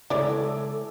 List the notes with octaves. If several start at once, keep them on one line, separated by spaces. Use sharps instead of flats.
C#3 E3 G#3 A4 C#5 D5